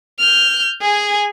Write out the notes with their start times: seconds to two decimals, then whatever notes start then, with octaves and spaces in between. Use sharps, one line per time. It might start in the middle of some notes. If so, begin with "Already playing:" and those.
0.19 F6 G6
0.81 G#4 G#5